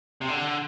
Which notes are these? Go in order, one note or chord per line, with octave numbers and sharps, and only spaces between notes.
C3
D3